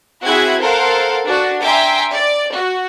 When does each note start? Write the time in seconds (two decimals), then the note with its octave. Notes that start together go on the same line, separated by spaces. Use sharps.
0.24 C4 E4 F#4 G#4 F#6 G#6
0.60 A4 A#4 C5 F5 F#5
1.25 D4 F#4
1.62 E5 G5 G#5 A#5 C6 D6
2.13 D5
2.53 F#4